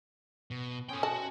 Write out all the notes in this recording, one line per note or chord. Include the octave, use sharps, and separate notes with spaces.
B2
C#4 G#4 A4 C5 G5
F#4 A5